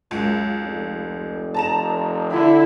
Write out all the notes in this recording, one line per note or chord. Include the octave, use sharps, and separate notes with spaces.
C#2 F#2
F1
A5 A#5 E7
D3 E4